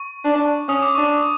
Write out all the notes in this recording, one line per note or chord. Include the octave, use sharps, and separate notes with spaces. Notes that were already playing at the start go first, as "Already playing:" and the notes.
Already playing: C#6
D4
C#4 D#6
D6
D4 C#6
D6